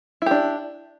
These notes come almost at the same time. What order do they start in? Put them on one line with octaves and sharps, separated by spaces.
E4 G4 D4